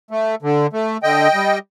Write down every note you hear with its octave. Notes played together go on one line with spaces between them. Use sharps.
A3
D3
A3
D3 D#5 G5
G3